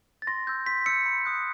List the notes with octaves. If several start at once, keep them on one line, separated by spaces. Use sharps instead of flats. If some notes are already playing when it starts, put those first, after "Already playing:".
A6
C6 A#6
E6 G6
C6 B6
E6 G6 C#7
B5
D#6 F#6